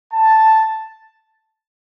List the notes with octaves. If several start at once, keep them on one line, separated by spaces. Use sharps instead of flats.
A5